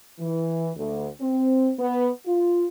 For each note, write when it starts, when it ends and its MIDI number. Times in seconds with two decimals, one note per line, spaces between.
0.20 0.70 52
0.76 1.08 38
1.21 1.73 60
1.79 2.10 59
2.26 2.67 65